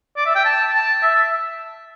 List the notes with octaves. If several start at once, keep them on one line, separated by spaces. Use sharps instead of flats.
D5
E5
G5
A5
A5
E5